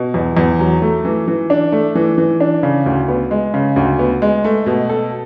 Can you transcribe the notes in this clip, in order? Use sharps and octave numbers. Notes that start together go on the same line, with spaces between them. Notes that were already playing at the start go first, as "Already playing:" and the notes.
Already playing: B2
E2
E2
F#3
A3
E3
E3
D4
A3
E3
E3
D4
C#3
D2
B3
G#3
C#3
D2
B3
G#3
A3
B2
A4